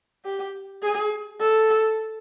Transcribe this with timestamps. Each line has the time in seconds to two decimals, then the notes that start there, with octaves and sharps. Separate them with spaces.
0.25 G4
0.82 G#4
1.40 A4